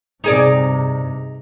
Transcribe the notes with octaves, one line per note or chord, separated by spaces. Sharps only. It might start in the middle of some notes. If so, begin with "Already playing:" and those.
G2 C3 D#4 G#4 D5